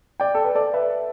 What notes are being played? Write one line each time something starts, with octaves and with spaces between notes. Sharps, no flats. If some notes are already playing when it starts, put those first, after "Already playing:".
D5 G5
A4
B4
A4 D5
B4 E5